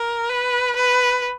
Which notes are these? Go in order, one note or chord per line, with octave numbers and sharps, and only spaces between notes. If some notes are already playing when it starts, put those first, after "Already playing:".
Already playing: A#4
B4
B4